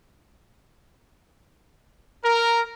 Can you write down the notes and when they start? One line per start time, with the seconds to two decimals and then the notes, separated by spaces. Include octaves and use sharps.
2.23 A#4